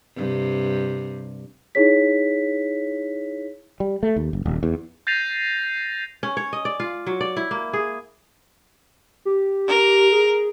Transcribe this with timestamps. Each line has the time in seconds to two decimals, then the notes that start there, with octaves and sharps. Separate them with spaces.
0.15 G2 C3
1.75 D#4 E4 G#4 C#5 B6
3.80 G3
4.03 A3
4.16 D#2
4.33 F#1
4.46 D#1
4.63 E2
5.07 G6 A6 A#6 C7 D#7 F7
6.23 C#4
6.37 C#5
6.53 D#5
6.65 D5
6.80 F4
7.06 F#3
7.21 D5
7.37 E4
7.51 A#3
7.73 G#4
9.25 G4
9.67 A#4
10.12 G#4